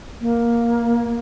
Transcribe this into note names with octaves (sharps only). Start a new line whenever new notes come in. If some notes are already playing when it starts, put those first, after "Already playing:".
A#3